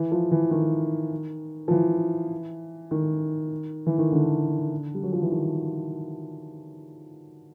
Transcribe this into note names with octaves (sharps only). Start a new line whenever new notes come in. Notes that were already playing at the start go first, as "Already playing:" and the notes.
Already playing: E3
F3
E3
D#3
F3
E3
D#3
E3
D#3
D3
G3
F#3
F3
E3
D#3